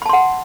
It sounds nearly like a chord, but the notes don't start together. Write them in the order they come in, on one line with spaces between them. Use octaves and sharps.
B5 A5 C6 F#5